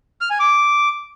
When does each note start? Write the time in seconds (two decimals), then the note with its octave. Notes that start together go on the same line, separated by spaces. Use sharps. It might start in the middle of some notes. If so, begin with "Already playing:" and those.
0.21 F6
0.30 G#5
0.40 D6